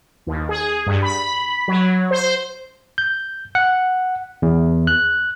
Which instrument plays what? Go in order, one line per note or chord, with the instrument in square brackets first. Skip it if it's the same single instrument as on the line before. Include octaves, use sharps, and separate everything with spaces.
[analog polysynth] D#2
G#4
G2
B5
F#3
C5
[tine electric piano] G6
F#5
E2
F#6